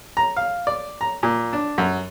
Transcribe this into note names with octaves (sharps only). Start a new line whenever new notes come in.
A#5
F5
D5
A#5
A#2
D4
F#2